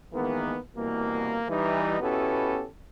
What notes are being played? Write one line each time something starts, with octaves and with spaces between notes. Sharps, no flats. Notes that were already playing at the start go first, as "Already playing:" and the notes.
D#3 E3 G#3 A#3 B3
C2 B2 E3 A#3
E3 G3 D#4
B2 B3 C#4 E4 G4 A4